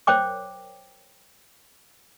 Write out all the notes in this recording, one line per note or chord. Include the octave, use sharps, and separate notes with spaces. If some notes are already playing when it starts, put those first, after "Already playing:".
A#4 C5 C#5 G5 D6